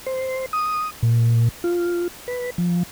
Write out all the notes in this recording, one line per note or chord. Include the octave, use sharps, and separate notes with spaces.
C5
D#6
A#2
F4
B4
F3